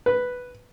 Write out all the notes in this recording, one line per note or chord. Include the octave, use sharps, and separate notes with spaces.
B4